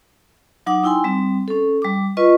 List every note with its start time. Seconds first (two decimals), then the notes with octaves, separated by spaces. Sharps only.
0.66 F#3 D#4 F#5 D6 D#6
0.84 D#4 E4 G5 G#5 C6
1.04 G3 C4
1.48 C#4 A4
1.82 G3 D6
2.17 F4 B4 D#5 C#6